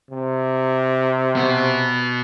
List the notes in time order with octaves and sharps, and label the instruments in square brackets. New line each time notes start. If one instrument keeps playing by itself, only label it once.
[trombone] C3
[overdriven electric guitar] B2 B3